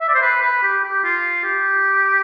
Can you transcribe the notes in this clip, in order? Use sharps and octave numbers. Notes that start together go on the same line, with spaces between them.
E5
D5
C5
B4
B4
G4
G4
F4
G4